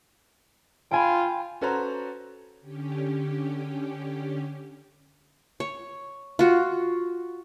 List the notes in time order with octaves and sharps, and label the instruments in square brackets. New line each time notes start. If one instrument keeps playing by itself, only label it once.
[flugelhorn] F4 [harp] G5 G#5 B5
[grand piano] C#4 F#4 A4 B4 C5 A#5
[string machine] D3 C#4 G4
[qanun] C#5
F4 F#4